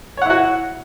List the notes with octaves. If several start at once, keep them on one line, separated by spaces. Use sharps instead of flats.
E4 F#4 C#5 F#5